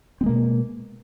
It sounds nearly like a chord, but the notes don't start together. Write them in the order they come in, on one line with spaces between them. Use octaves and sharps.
C4 G#3 A#3 B2